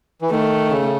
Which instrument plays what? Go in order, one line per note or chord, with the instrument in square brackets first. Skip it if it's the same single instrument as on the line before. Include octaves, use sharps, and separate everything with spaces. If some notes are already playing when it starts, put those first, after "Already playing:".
[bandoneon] E3
[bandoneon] D#3 [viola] A3
[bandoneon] C#3